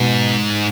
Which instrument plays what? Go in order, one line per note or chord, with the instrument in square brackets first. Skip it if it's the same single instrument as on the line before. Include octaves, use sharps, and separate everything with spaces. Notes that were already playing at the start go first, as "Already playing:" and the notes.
Already playing: [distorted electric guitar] G#2 [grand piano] B2